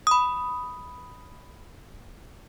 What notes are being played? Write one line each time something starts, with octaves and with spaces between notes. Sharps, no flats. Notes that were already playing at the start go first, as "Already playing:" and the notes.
B5 D#6